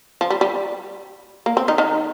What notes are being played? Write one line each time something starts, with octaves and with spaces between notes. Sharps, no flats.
F3
G3
G3
A#3
C4
D#3 D#4
D#3 D#4